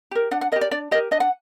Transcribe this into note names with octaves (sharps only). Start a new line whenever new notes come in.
G4 A#4
D4 F#5
F#5
G4 A#4 D#5
D5
D4 D5
G4 A#4 D#5
D4 D#5
F#5